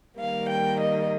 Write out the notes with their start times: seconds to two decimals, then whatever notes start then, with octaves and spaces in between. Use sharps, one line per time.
0.19 D#3 G3 A#3 F5
0.50 G5
0.81 D#5